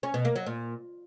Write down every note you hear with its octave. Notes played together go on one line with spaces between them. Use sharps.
C#4
B2
A#3
F#3
A#2